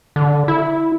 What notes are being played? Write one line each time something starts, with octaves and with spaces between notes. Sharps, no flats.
D3
E4